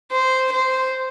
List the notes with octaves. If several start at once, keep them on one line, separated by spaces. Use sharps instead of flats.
C5
C5